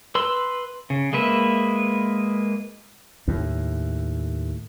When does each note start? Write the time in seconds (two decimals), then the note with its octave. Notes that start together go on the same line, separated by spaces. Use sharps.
0.15 B4 C6 E6
0.90 C#3
1.13 G#3 A#3 B4 E5
3.28 D#2 A2